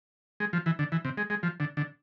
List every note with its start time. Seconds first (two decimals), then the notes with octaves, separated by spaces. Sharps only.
0.40 G#3
0.53 F3
0.66 E3
0.79 D3
0.92 E3
1.05 C3
1.18 G#3
1.30 G#3
1.43 F3
1.60 D3
1.77 D3